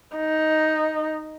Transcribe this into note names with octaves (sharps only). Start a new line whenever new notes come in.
D#4